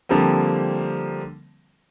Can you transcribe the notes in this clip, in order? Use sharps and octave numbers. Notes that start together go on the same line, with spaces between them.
D3 F3 G3 A#3 C4